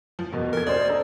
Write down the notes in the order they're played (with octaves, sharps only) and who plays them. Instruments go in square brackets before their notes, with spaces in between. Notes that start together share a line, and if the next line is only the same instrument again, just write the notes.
[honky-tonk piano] F3
[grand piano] E2 B2 [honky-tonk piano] A#3
[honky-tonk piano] A4 G#6 [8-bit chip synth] A#4
[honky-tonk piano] A#3 C4 D#5 [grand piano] C#4 C5 [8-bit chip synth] D5
[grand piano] D4 A4 A#5